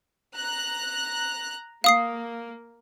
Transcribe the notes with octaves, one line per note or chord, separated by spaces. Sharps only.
A#5 F#6
A#3 F5 D#6 C7